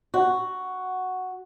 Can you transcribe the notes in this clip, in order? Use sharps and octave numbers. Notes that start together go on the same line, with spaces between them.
F#4